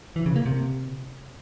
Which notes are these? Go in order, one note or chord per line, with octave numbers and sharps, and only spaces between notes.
E3
C#3
A#3
C3